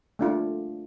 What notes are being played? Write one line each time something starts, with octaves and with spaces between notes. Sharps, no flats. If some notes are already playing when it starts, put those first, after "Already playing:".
A3 D4 F4